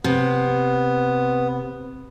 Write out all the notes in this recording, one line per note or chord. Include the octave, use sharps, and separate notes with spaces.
C3 B3